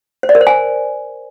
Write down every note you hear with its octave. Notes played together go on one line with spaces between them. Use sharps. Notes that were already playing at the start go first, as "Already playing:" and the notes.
C5
D5
A#4
C5
G#5